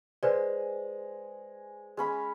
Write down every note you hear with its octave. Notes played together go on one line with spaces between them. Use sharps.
G#3 B4 C5 D5
G#3 C#4 B5